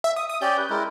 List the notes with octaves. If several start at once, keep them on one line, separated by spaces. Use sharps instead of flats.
E5
D#6
D#6
C#4 G4 D5 G6
B4
G#3 E4 A#4